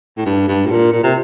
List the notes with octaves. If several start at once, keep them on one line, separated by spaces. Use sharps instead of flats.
A2
G2
G2
A2
A#2
A#2
C3